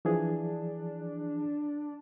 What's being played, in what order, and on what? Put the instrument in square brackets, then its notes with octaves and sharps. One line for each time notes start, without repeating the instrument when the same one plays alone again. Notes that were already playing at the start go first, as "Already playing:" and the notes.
[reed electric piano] E3 F3 G#4 [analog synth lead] D4